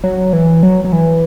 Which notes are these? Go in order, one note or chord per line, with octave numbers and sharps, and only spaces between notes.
F#3
E3
F#3
F#3
E3